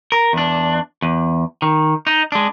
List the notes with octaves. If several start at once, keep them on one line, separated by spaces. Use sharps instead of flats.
A#4
E2 D4
E2
D#3
D#4
G#3 D4